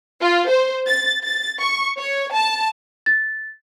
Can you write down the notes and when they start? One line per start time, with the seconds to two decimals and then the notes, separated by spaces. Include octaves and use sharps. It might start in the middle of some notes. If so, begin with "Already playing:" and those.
0.21 F4
0.50 C5
0.87 A6
1.22 A6
1.61 C#6
1.99 C#5
2.33 A5
3.06 A6